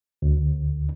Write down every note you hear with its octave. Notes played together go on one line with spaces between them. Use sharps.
D2